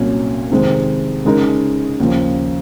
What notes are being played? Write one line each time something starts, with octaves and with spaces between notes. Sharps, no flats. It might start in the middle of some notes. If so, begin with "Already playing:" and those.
Already playing: C2 A#2 F#3 C#4
F2 C3 D#3 G#3 C4
C#3 G#3 D#4 A#4
D#2 C#3 F3